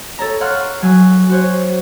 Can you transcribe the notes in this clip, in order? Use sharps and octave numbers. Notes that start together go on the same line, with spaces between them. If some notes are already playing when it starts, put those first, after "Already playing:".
A4 C#5 A#5
C#5 F5 F#5 C6 F6
F#3 G#5
F#4 C5 C#5